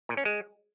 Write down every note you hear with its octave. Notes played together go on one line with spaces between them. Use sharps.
A#2
C#4
G#3